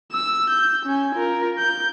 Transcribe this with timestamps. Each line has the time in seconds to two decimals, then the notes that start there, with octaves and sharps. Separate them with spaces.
0.12 E6
0.50 G6
0.86 C#4 G#5
1.15 F4 A#4
1.58 G6